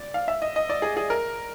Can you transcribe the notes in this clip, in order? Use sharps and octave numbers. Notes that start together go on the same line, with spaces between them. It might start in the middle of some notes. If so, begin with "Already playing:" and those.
Already playing: D5
F5
E5
D#5
D#5
D5
G#4
G#4
A#4